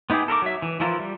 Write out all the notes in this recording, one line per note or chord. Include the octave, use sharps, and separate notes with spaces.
B3 D#4 E4 G4 G#4
A4 A#4 D#5 D6
F#3 E5
E3
E3 F3 E4 F4 A#4
G3